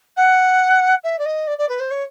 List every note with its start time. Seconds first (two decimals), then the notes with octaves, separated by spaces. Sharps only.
0.16 F#5
1.03 E5
1.18 D5
1.25 D#5
1.47 D5
1.58 D5
1.69 B4
1.79 C5
1.90 C#5